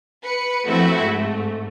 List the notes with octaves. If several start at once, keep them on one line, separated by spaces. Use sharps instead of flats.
B4 C#7
F3 A3 C4 E4 F#4 E5
G#2 A3